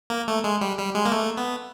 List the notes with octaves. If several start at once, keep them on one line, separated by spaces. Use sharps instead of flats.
A#3
A3
G#3
G3
G3
G#3
A#3
A3
B3